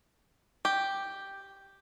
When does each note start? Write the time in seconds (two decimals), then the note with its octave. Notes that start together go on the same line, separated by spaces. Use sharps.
0.65 G4